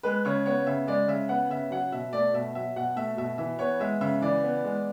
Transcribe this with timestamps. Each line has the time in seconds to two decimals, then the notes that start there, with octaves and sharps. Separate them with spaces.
0.03 G#3 B4
0.25 C#3 C#5
0.46 B3 C#5
0.67 C#3 E5
0.87 G#3 D5
1.08 C#3 E5
1.29 B3 F#5
1.50 C#3 E5
1.71 F#3 F#5
1.92 B2 E5
2.13 A3 D5
2.34 B2 E5
2.55 F#3 E5
2.76 B2 F#5
2.96 A3 E5
3.17 B2 E5
3.38 E3 E5
3.59 B3 C#5
3.80 G#3 E5
4.01 C#3 E5
4.22 E3 D5
4.43 B3
4.64 G#3